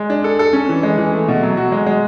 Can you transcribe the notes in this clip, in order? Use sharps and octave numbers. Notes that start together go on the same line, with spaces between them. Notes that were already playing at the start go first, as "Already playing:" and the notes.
Already playing: G#3
D4
A4
A4
C#4
E3
G#3
E3
A3
B2
F#3
F#4
G#3
G#3